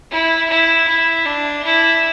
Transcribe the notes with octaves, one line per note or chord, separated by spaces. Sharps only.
E4
E4
E4
D4
E4